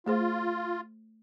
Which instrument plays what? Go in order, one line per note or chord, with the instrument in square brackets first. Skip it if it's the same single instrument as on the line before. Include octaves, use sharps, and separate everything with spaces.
[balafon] A3 G#4 C5 [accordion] F4